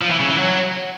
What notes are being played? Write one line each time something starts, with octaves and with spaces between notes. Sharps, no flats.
F3
E3
C#3
E3
F#3